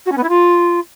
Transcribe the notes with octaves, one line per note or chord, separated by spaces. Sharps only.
F#4
C#4
B3
E4
F4